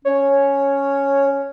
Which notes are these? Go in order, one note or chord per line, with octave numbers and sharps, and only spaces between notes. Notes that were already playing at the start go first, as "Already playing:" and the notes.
C#4 C#5